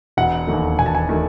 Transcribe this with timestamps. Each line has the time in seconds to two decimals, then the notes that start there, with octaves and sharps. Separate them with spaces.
0.17 E1 F#5
0.47 D#2 D#3 A3
0.79 E1 G#5
0.86 A5
0.95 G#5
1.09 D#3 A3